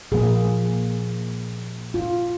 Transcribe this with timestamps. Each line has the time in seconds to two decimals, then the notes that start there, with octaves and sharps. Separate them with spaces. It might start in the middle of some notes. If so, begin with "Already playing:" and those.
0.12 A#2 F3 A#3 G#4
1.94 F4